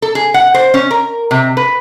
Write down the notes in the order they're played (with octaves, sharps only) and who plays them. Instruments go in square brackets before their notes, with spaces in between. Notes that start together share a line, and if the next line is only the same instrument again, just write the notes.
[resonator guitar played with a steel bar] A4
G#4
F#5
C5
C#4
A#4
C3
B4